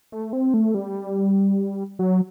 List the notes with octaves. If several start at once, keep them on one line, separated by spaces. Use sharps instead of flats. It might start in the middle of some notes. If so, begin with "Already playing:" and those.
A3
C4
A3
G3
F#3